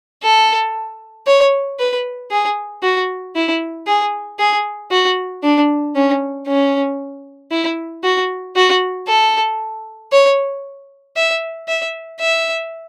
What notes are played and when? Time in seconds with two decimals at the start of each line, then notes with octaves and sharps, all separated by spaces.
0.23 A4
1.27 C#5
1.79 B4
2.31 G#4
2.83 F#4
3.35 E4
3.87 G#4
4.39 G#4
4.91 F#4
5.43 D4
5.95 C#4
6.47 C#4
7.51 E4
8.04 F#4
8.56 F#4
9.07 A4
10.12 C#5
11.16 E5
11.68 E5
12.20 E5